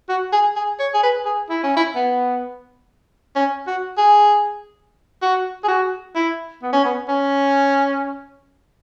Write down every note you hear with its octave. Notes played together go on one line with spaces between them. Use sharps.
F#4
G#4
G#4
C#5
G#4
B4
G#4
E4
C#4
E4
B3
C#4
F#4
G#4
F#4
G#4
F#4
E4
B3
C#4
B3
C#4